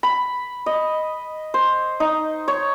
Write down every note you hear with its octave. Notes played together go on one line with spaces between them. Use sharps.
B5
D#5
C5
D#4
C#5